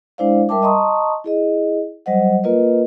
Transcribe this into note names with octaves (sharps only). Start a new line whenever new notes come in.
G#3 D4 E4 C5 D5 F5
G3 A#4 E5 G5 A5 D6
D#5 A5 A#5 C6 C#6 D#6
E4 G#4 D#5
F#3 G3 C5 D#5 F#5
A#3 F4 A#4 B4 D#5